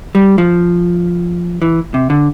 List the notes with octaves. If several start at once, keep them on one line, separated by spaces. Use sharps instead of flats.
G3
F3
E3
C3
D3